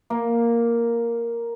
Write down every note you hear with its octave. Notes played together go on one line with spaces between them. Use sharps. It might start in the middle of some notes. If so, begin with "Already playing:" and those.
A#3